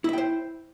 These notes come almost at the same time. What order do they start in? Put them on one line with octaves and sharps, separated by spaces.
E4 E5 G5 C5